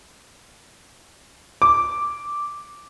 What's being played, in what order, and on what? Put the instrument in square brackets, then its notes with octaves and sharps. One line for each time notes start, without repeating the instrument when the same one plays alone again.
[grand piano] D6